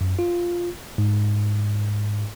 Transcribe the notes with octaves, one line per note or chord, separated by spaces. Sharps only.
F#2
F4
G#2